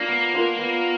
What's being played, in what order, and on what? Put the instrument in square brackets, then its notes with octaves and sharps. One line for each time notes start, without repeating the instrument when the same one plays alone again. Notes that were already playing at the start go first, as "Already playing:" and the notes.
Already playing: [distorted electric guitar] A#3 [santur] D4 F4
[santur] B3
D4 F4 A#4
B3